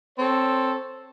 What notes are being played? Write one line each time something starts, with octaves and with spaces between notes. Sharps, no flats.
C4 A4 C#5